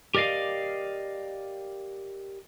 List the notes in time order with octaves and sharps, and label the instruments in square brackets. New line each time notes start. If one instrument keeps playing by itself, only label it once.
[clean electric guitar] G4 A#4 D5 D#5 F5